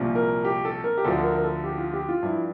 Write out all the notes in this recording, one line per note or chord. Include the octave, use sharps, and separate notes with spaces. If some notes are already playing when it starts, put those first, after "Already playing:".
Already playing: C2 A#2 F3
A#4
G4
A4
A#4
G4
D2 D3 F3 A4
A4
A#4
A#4
A4
G4
F4
G4
F4
G2 F3 E4